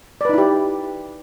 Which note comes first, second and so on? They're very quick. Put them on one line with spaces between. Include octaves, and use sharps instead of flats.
D5 B4 D#4 E4 G4